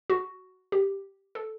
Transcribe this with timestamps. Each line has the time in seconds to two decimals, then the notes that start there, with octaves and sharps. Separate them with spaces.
0.10 F#4
0.72 G4
1.35 A4